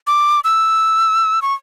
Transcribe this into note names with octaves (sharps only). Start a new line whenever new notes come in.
D6
E6
C#6